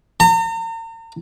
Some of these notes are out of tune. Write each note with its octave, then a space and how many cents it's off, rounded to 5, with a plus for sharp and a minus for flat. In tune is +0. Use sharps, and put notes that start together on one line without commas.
A#5 -40